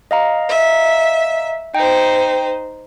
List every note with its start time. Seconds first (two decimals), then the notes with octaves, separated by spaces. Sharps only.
0.11 D#5 F5 A#5
0.48 E5
1.75 D#4 C5 G5